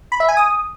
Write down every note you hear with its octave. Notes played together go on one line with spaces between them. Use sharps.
B5
E5
G#5
D#6